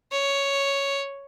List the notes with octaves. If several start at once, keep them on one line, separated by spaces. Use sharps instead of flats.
C#5